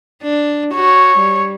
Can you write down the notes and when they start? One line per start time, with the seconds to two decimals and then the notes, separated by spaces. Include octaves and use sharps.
0.23 D4
0.75 F#4 C#5
1.18 G3